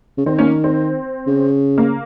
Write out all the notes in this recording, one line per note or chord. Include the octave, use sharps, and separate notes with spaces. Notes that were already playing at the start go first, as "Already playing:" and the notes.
C#3
D#3 C4
A#3 C#4
C4
C#3
A#3